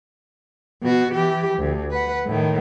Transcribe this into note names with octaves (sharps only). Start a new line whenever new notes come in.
B2 F#4
E3 G4
D2
B4 F#5
A2 D#3